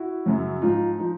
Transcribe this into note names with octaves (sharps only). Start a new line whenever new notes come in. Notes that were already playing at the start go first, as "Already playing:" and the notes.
Already playing: E4 F#4
F#2 C#3 F#3
G#2 F3 D#4 F4
F3 D#4